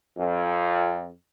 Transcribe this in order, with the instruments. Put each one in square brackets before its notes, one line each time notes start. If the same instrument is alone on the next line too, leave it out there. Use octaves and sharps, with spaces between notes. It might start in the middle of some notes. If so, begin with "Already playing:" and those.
[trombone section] F2